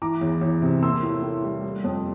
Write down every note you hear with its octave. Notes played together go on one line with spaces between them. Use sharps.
E3 A#5 D6
E2
E2
C3
A#3 C6 E6
A2
A2
G3
G3
F2